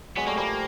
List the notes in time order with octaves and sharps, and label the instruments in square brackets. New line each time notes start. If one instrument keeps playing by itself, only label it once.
[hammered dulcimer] F#3 G#3 [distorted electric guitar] B3
[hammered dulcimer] G3 A3 [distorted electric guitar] A#3
[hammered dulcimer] F3 G3 [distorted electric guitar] A#3